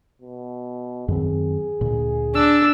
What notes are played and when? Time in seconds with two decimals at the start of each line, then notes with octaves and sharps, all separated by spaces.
0.22 B2
1.08 F#2 D#3 C4 G#4
1.81 D2 A#2
2.35 D4 E6